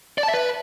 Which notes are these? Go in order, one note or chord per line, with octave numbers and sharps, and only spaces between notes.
D5
A5
E5
B4